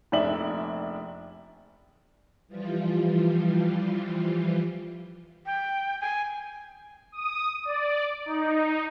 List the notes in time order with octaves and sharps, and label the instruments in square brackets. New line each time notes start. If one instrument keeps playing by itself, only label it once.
[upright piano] F1 A#1 D5 E5 F#7
[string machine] E3 F3 G3 F4
[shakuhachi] G5
G#5
[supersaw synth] D#6
D5
D#4